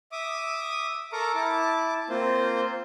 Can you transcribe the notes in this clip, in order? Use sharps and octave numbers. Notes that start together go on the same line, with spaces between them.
E5 D6 D#6
A4 A#4 A#5 C#6 D6
E4 A5 D6
A#3 C4 F4 C5